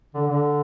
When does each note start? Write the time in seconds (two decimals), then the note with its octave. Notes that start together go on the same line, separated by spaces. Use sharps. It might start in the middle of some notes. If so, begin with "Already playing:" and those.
0.15 D3
0.27 D3